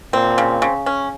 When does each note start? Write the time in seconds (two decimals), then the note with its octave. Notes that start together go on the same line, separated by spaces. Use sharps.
0.13 A#2 C4
0.38 C#3
0.62 C#3
0.86 C#4